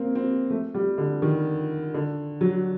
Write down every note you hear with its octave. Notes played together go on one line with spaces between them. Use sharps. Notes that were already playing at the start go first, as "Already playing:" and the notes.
Already playing: A#3 C4
C4
A3
G3
D3
D#3
D3
F#3